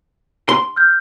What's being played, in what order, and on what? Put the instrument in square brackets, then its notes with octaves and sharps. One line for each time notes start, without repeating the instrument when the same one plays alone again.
[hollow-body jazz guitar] C6
[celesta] F6 G6